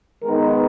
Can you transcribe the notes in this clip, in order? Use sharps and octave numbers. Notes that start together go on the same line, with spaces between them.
D#3 G#3 B3 D#4 A#4